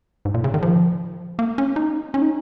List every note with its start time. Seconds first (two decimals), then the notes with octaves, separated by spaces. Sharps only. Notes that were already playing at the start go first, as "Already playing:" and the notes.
0.25 G#2
0.34 A#2
0.44 C#3
0.54 D#3
0.62 F3
1.39 A#3
1.58 C#4
1.76 D#4
2.14 C#4
2.22 D#4